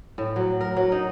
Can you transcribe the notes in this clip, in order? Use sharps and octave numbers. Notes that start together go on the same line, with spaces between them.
A2
F#3
A#4
F#3
D#4